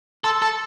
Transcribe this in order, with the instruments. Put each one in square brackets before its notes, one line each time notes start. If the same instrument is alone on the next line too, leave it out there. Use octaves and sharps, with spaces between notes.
[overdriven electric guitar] A4 [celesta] C6 E6
[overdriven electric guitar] A4